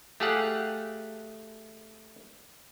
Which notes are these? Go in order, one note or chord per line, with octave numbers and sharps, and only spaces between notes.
A3 G4 G#4 F5 F#5